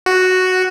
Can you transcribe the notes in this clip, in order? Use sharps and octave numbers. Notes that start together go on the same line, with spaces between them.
F#4